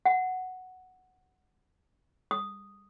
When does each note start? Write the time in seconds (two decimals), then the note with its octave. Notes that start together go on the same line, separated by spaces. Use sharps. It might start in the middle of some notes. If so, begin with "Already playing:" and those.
0.05 F#5
2.31 D#6